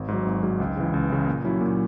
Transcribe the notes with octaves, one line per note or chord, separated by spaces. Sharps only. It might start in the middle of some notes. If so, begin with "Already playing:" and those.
Already playing: G#1
G#2 F#3
G#1
G#2 F#3
C#2
C#3 E3
C#2
C#3 E3
A#2
F#3 C#4 E4
A#2